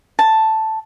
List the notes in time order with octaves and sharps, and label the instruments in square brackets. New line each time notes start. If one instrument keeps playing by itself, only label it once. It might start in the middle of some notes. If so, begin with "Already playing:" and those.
[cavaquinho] A5